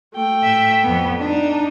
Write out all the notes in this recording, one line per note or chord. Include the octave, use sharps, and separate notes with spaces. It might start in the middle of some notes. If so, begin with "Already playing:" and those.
A3 G5
A2 E5
F2 B3
D4 D#4